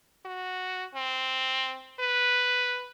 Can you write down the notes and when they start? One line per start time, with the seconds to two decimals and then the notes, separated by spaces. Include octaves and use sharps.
0.25 F#4
0.95 C4
2.00 B4